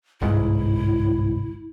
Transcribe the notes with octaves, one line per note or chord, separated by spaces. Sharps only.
G1 C2 G#2 E4